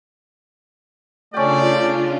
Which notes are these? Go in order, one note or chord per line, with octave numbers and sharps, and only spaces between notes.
C#3 A3 C#4 D4 F4 D5 G5